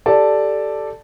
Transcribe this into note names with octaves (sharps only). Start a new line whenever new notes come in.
G4 A4 D5 A5